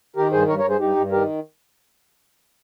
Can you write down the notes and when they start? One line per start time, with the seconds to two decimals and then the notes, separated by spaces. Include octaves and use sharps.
0.16 D#3 G4 A#4
0.32 G2 G#4 C5
0.48 G2 A#4 C#5
0.59 A#4 C#5
0.64 G2
0.69 G#4 C5
0.79 G2 D#4 G4
0.96 G2
1.12 D#3 G4 A#4